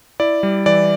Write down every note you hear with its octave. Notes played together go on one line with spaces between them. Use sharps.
E4 D5
G3
E3 D5